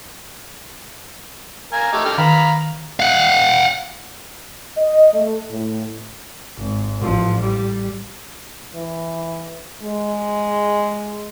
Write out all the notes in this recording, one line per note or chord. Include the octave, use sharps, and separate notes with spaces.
A#4 F5 G#5
A3 D#4 G4
D3 G5 F6
D#3 F5 A#5 B5
F5 F#5
D#5
A3
A2
G#1
A1 F3
G3
E3
G#3